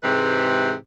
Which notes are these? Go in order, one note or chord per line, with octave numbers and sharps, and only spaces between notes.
G#2 C3 E3 G#3 G4 B4